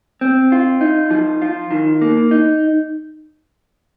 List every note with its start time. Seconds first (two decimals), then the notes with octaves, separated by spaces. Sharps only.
0.21 C4
0.52 F4
0.81 D#4
1.11 F3
1.42 F4
1.71 D#3
2.01 A#3
2.31 D#4